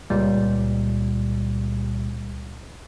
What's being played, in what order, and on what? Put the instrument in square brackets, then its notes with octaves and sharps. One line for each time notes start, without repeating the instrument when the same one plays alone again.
[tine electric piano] C#2 A#2 G3